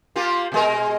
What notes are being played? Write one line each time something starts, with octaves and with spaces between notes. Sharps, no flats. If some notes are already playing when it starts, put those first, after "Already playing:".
A#3 F4 G4
B2 G#3 A#4